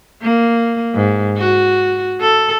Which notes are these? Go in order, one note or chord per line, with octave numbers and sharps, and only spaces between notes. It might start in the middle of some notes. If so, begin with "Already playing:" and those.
A#3
G#2
F#4
A4